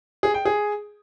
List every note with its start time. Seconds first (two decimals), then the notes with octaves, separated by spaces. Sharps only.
0.23 G#4
0.34 G5
0.45 G#4